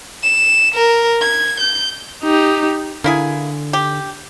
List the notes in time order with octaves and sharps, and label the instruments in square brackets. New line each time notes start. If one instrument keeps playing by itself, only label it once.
[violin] E7
A#4
G#6
G6
[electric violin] D#4 G4
[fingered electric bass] D3 [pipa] A#3 E4 G#4
[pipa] G4